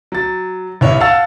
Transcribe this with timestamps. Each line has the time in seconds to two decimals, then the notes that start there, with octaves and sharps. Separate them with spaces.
0.12 F#3 A6
0.81 C2 G2 E4 C#5 D#5
1.00 F5 F#5 A5 E6 A6